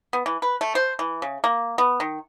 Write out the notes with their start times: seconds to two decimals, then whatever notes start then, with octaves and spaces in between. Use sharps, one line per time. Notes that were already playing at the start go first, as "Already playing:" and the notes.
0.13 B3
0.26 E3
0.42 B4
0.61 A3
0.75 C5
0.99 E3
1.22 C#3
1.44 A#3
1.78 B3
2.00 D#3